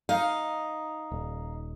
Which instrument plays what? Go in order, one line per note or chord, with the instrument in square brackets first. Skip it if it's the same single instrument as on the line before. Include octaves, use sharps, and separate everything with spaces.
[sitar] D#4 [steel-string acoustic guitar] F5
[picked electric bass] D#1